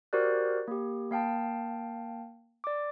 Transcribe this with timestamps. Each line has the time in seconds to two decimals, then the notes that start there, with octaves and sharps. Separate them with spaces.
0.13 F#4 G4 A#4 C5 D5 F#6
0.68 A#3 G4
1.11 A#3 F5 G5 A5
2.64 D5 D6